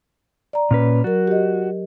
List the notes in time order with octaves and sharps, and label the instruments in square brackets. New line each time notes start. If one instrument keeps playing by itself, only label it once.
[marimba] D5 A#5
[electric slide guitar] A#2 C#4 B4
[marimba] F#3 A#4 [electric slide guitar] F#4
[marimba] G4 D#5